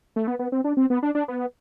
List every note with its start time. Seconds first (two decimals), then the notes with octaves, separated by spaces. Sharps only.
0.16 A3
0.27 B3
0.39 B3
0.52 C4
0.64 D4
0.77 C4
0.90 B3
1.03 D4
1.15 D4
1.28 B3